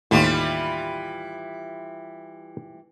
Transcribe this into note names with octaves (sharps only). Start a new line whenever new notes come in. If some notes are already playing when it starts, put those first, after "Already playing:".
D#2 A2 E3 G3 F4